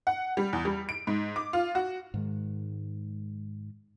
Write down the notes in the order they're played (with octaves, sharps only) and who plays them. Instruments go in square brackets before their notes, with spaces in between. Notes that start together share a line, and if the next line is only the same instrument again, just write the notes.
[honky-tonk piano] F#5
G3
E2
G3
D7
G#2
D6
F4
F#4
[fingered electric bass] G#2 D#3 G#3